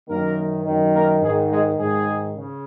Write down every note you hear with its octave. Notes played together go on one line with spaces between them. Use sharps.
F#2 D#3 A#3 A#4
F#2 D#3
A#3 A#4
G#2 D#3 G#3 G#4
G#3 G#4
G#2 D#3 G#3 G#4
C#3